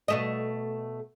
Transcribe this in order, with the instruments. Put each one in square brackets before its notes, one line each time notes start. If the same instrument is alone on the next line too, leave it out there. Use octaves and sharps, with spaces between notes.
[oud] B2 A3 D#5